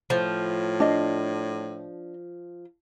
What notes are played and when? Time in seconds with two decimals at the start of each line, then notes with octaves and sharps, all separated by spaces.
0.10 A2 F3
0.80 D4 D#5